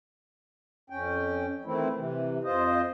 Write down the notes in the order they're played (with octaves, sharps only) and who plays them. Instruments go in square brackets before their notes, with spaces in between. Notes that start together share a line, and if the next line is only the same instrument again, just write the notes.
[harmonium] F2 C#4 G5
D#3 E3 A3 C4 E4
C3 E3
F2 F4 C5 D#5